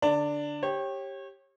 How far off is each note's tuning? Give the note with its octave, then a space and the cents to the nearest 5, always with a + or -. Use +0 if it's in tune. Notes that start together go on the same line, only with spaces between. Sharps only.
D3 +0 D4 +0 A5 +45
G4 +0 C#5 -30